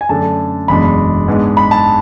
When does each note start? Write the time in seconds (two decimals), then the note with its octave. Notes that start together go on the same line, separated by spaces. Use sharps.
0.01 G#5
0.09 F#2 D3 A3 D4 A5
0.68 F#1 E2 B2 G#3 D4 B5
1.28 G#2 G#3 B3 D4
1.57 B5
1.71 A5